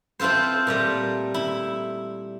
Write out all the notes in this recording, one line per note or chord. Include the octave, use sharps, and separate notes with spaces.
C4 E4 F4 A4 C5
A#2 G3 A3
E4